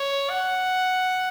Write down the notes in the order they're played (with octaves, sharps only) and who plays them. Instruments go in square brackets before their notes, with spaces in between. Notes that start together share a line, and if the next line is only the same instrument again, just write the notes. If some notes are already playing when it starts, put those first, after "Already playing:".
Already playing: [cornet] C#5
F#5